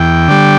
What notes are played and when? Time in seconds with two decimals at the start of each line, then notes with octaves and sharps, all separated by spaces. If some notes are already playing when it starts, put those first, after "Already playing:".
Already playing: E2 G5
0.28 D3 G3